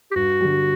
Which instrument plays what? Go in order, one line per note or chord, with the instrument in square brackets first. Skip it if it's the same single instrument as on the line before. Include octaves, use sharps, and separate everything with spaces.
[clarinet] G4
[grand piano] G2 [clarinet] F#4
[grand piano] D3 G3